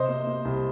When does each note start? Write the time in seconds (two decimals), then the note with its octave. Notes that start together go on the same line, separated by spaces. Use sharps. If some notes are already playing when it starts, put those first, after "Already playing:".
Already playing: C3 C5 D#5
0.08 A#3
0.27 A#3
0.45 C2